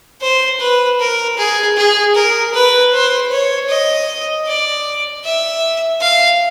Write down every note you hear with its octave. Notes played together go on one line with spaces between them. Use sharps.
C5
B4
A#4
G#4
G#4
A#4
B4
C5
C#5
D#5
D5
E5
F5